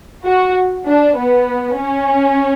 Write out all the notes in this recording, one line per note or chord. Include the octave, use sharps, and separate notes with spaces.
F#4
D4
B3
C#4